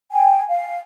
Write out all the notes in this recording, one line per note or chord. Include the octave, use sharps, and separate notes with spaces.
G5 G#5
F5